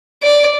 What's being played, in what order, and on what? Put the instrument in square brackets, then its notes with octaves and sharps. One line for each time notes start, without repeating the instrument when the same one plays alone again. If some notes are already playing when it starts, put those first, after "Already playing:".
[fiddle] D5